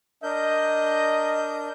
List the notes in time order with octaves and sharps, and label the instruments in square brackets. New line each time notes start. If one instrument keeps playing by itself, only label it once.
[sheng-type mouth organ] D4 A#4 G6 [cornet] D#5